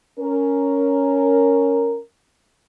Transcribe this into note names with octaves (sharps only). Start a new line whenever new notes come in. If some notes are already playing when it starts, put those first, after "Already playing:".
C#4 A#4